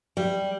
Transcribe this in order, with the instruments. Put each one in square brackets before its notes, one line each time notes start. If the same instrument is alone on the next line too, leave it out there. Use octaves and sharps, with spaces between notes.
[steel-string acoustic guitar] G3